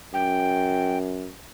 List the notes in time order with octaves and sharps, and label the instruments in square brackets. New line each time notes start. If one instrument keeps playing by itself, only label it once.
[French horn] F#2 [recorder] G5